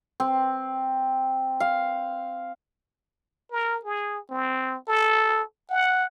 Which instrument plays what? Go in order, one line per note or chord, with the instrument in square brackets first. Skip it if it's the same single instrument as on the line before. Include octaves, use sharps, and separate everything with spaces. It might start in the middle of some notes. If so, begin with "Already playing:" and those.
[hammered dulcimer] C4
F5
[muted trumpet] A#4
G#4
C4
A4
F#5